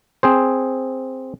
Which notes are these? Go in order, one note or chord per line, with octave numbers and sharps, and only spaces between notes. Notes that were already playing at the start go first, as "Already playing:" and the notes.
C4 G#4 C5